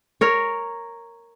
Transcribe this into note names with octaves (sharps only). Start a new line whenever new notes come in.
A#4 C#5